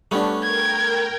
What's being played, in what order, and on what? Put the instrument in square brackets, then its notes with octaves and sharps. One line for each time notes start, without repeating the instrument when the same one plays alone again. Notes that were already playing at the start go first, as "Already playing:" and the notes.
[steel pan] G3 D4 [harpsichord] A3 B3 C#4
[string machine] A#4 G5 [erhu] G#6